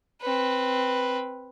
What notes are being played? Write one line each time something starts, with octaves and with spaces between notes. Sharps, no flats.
C4 B4